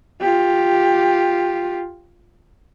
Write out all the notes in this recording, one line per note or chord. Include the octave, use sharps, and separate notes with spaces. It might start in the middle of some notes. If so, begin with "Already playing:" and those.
F4 G4